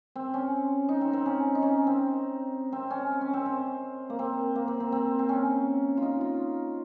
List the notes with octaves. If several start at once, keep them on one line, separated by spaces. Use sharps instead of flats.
C4
C#4
D#4
C4
C4
C#4
D#4
C#4
C4
C4
C#4
C#4
C4
C4
A#3
C4
A#3
C4
C4
C4
C4
C#4
D#4 F4
F4